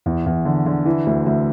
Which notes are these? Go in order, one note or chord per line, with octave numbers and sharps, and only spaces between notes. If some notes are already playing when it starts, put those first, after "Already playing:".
E2
E2
D3
D3
E3
D2
D2